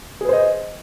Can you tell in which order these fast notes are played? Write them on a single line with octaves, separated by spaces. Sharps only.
G#4 B4 C5 D#5